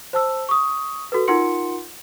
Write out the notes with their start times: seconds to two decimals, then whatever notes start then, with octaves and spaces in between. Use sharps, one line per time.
0.13 C5 A5 E6
0.49 C#6 D#6
1.12 F#4 A4 B4
1.28 D#4 F4 A#4 F#5 C6 C#7